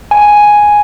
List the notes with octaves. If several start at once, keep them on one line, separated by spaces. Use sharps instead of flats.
G#5